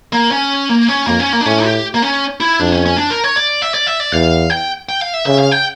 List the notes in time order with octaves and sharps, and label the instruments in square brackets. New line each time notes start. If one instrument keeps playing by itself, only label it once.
[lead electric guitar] A#3
C#4
A#3
C#4
[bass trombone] F2 [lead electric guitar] A#3
[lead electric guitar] C#4
A#3
D4
[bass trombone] A2 [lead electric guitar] C#4
[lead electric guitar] G4
A#3
C#4
E4
[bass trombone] F2 [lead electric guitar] D4
[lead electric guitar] C#4
C#4
D4
A#4
C#5
D5
E5
D5
E5
D5
[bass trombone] E2 [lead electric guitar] F5
[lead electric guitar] G5
G5
F5
E5
[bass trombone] C#3 [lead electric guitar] E5
[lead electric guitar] F5
G5